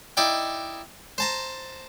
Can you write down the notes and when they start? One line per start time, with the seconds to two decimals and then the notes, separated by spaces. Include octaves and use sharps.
0.17 D#4 E4 D5 G5
1.18 C5 A5 A#5